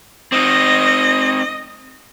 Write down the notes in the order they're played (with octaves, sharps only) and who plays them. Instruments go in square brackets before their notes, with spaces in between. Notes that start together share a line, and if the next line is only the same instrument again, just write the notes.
[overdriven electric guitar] C4 D#4 [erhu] D#5